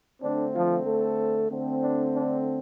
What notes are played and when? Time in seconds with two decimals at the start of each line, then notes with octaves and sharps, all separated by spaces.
0.22 D3 A3 C4 D4
0.54 F3 F4
0.86 A3 A4
1.50 D3 A3 C4
1.82 D4
2.15 D4